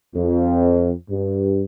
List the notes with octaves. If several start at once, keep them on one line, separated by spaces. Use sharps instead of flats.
F2
G2